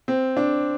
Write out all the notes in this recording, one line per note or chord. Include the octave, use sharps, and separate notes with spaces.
C4
D4